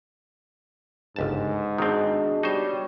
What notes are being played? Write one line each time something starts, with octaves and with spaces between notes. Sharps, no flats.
G1 C#2 G#2 A5
B2 D#3 C4 D4 G#4 D#5
G3 D#4 C5 C#5